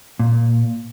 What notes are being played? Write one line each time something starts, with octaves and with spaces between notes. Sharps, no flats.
A#2